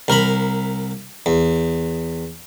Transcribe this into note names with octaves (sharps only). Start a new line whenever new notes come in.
C2 A#4 A#5 B5
E2